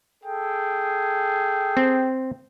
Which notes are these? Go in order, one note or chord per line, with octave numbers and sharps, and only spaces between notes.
G#4 A4 G5
C4